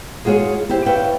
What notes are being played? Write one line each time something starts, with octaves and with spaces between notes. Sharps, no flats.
G#3 F4 F#4 G#4 C#5
E4 G4 C5
B4 C#5 D5 E5 F5 G5